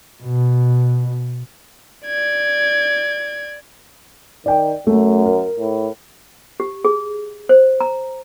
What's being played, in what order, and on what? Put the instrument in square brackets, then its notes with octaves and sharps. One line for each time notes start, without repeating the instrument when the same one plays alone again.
[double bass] B2
[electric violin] D5 G#6
[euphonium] D#3 [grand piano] D5 G5
[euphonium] F#2 [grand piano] A3
[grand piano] A#4
[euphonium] A2
[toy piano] G4
G#4
C5
A#5